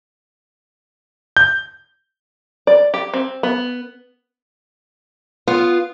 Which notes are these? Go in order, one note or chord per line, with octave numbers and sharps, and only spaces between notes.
G6
D5
G4
C4
B3
B3 F4